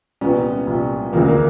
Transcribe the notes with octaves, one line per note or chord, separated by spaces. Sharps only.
C2 A#2 F3 B3 C#4
C2 A#2 F3
D2 C#3 F3 A#3
A#3